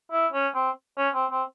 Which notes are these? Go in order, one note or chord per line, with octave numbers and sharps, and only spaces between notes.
E4
C#4
C4
C#4
C4
C4